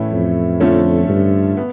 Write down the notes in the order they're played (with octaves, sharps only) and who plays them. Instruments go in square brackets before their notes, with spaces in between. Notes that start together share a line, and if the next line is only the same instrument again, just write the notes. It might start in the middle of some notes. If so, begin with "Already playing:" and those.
Already playing: [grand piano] A2 E3 A3 C#4 E4
[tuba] F2
[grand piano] D3 F3 A3 C#4
[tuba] G2
[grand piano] B3